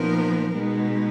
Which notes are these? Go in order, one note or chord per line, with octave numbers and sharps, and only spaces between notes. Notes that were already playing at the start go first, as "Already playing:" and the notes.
Already playing: A#2 F3 B3 D#4 A#4
B2 G#3 B3 D#4